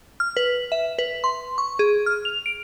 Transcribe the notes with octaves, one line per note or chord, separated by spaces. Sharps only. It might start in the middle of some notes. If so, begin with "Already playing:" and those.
F6
B4
E5
B4
C6
C#6
G#4
F6
F7
D7